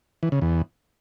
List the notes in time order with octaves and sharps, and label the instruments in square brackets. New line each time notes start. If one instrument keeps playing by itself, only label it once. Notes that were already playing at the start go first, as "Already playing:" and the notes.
[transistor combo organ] E3
C#3
E2